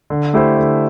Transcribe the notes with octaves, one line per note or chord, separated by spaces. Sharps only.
D3
A3 E4 G4 C5
D3